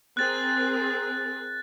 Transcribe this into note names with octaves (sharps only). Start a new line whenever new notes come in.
C4 G#4 A#4 F#6 A6